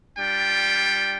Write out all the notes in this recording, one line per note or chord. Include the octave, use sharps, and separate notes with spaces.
G3 D4 F4 G5